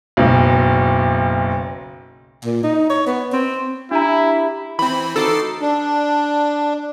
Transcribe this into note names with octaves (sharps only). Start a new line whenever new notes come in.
F#1 B1
A#2
D#4
C#5
B3
C4
D4 E4 G4 E5 A#5 B5
E3 C4 B5
A3 D#4 F#4 A4 A5 D6 C7
D4